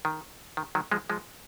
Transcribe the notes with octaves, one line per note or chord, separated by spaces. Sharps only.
D#3
D#3
D#3 F#3
F3 G#3
F3 G#3